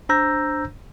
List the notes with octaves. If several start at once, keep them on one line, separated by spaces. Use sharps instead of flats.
D4 C5 A#5 E6 G6 A#6